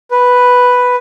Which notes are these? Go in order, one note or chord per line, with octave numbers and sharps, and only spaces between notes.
B4